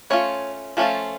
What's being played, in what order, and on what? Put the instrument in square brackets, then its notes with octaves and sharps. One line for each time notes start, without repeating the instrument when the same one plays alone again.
[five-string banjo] A3 C#4 F4 C#5
F3 A3 C#4 F4